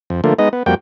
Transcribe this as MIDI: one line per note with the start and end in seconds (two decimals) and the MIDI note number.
0.10 0.21 41
0.24 0.34 50
0.24 0.34 53
0.24 0.34 57
0.24 0.34 58
0.39 0.49 56
0.39 0.49 59
0.39 0.49 63
0.39 0.49 75
0.53 0.63 59
0.66 0.75 41
0.66 0.75 55
0.66 0.75 58
0.66 0.75 66
0.66 0.75 79